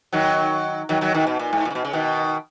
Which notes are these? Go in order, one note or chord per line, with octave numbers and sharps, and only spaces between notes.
D#3 F#3
D#3 F#3
D#3 F#3
B2 D#3
B2
A#2
G#2
A#2
C#3
B2
C#3
B2 D#3